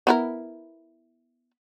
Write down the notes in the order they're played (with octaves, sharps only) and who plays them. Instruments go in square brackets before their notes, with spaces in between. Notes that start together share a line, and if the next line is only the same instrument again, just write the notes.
[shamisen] B3 E4 A#4